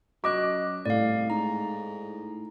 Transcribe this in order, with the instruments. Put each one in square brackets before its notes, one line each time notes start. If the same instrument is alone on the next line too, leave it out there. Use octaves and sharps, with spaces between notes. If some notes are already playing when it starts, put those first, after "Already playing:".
[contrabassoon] F#2 [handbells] F#4 D#5 F#6 [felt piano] D6
[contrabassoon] C2 [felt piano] A2 [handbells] D5 F5
[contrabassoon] G#2 [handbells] A#5